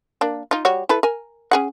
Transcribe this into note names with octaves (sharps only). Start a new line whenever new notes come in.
A#3 D4
D#4 F4
G3 F#4 C#5
E4 A4 B4
A#4 G#5
C#4 G#4 F#5